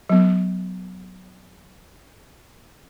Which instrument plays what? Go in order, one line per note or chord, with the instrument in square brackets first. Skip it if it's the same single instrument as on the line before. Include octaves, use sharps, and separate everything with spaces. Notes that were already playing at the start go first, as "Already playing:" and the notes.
[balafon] F#3 B3